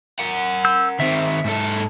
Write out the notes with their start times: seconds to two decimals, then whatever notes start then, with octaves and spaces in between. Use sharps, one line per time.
0.19 A#4 F#5
0.65 E6 G6
1.00 D#3 C4 E5
1.44 G#2 A4